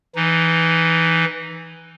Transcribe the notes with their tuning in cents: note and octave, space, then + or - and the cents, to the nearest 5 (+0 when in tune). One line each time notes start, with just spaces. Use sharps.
E3 +0 D#4 +0